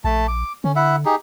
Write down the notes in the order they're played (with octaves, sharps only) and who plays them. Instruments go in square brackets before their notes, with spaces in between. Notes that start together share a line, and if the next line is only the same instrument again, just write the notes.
[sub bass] A#1 [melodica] A3 A5
[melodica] D6
[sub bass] D3 [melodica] C#4
[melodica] E4 E5 F#5
D#4 G4 G#4